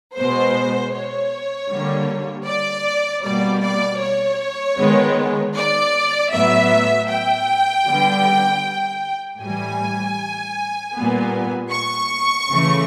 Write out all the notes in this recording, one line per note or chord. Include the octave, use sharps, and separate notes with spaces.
B2 G#3 B3 C5
C#5
D3 G3 A#3
D5
B2 G3 A#3 D5
D5
C#5
D#3 G#3 B3
D5
A2 F#3 B3 E5
G5
D3 G3 B3
A2 E3 G3 G#5
A#2 G3 B3
C#6
C#3 E3 A3